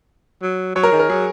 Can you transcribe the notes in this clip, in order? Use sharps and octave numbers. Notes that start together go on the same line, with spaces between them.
F#3
F#3 C#5
A#4
D#3 G#4
A#4
F#3 G#4